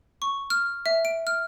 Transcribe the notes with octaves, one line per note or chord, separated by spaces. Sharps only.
C#6
F6
E5
D7
F6